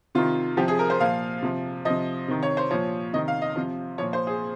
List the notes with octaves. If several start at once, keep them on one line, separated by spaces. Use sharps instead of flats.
C3 D#3 F4
C3 F3 G4
G#4
A#4
C5
A#2 F3 F5
C3 F3
C3 F3 D#5
C3 D#3
C#5
C5
A#2 F3 C#5
C3 D#3 D#5
F5
D#5
C3 F3
A#2 F3 C#5
C5
G#4